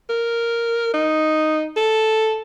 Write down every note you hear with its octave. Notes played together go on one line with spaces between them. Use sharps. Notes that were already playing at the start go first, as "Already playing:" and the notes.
A#4
D#4
A4